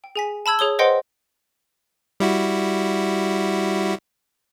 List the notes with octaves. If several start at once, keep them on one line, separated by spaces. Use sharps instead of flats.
G5
G#4 G#5 B6
A5 B5 E6 G#6
G#4 C#5 D#6 G7
B4 C5 D#5 F#5 G5 C6
G3 E4 F#4